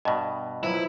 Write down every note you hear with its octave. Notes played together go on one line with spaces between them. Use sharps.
G2 B2 D#5
F3 F#3 E4 B4